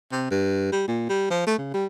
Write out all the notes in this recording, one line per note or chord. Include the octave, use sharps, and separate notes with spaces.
C3
G2
G3
A#2
G3
F3
A3
C#3
G3